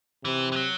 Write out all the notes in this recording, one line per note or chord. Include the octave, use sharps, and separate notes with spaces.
C3 E3
E3
F#3